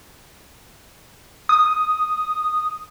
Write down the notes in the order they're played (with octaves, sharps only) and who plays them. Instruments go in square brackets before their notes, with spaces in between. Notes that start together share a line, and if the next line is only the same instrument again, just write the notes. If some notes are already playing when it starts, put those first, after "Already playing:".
[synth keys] D#6